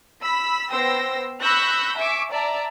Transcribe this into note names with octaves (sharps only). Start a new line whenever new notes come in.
B5 E6 B6
B3 C5 G5 E6 A#6
B5 C#6 E6 F#6 G6 A#6
E5 G#5 C#6 D6
D5 E5 A5 A#5